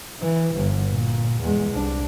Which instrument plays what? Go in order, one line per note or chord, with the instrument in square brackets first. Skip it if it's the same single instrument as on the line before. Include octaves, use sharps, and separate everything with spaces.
[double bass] E3
G1
A#2
E2 G#3
C2 D4